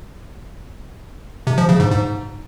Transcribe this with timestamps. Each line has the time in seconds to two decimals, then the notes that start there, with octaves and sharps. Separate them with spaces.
1.47 C3
1.58 F3
1.69 C#3
1.80 G#2
1.91 G#2